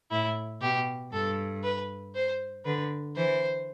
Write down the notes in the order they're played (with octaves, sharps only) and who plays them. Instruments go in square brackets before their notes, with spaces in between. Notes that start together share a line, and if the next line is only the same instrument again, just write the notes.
[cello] A2 [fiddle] E4
[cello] B2 [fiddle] G4
[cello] G2 [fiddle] A4
[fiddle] B4
C5
[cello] D3 [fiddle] B4
[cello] E3 [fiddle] C5